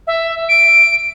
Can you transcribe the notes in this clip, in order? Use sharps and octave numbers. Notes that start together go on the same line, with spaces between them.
E5
D7